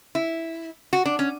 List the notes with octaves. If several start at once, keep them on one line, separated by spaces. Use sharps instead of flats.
E4
F#4
D4
C#4